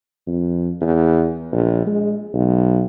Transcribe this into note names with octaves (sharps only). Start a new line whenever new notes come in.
F2
E2
A#1
G#3
B1